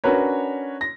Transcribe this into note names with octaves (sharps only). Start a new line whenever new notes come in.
C#4 D4 F#4 A#4 B4 C#5
A#6